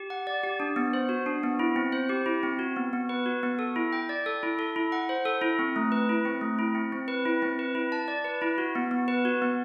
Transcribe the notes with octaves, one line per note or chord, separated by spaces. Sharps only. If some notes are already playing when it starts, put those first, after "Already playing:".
Already playing: G4
F#5
D5
G4
D4
B3
C5
F#4
D4
B3
E4
C4
C5
G4
E4
C4
F#4
B3
B3
B4
F#4
B3
A4
E4
G5
D5
A4
E4
A4
E4
F#5
C5
A4
E4
C4
A3
B4
E4
C4
A3
E4
C4
C4
B4
E4
C4
B4
E4
A5
D5
B4
E4
F#4
B3
B3
B4
F#4
B3